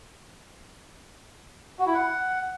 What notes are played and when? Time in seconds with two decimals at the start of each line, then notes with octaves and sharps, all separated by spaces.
1.79 F#4
1.86 E4
1.94 F#5